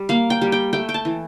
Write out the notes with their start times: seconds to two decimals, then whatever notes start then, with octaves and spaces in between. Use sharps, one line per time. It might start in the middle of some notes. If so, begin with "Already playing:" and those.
Already playing: G3
0.09 A#3 F5
0.30 G5
0.41 G3
0.52 G5
0.73 A3 G5
0.89 G5
0.94 A5
1.05 E3